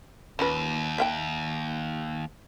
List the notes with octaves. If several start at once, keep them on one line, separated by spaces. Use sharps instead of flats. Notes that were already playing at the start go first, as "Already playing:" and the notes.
D#2 C#4 F4 B4
E5 F5 G5